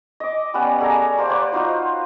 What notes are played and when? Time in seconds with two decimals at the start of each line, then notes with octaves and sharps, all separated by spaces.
0.20 D#5 D6
0.54 G3 B3 C#4 F#5
0.80 A3 G#4 D5 A#5
1.17 A#3 G4 C5 D5
1.30 B4 C5 D5 F#5
1.52 F#3 D#4 F4 F#4